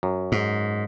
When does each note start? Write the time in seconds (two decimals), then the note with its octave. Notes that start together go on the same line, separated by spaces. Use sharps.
0.03 F#2
0.32 G#2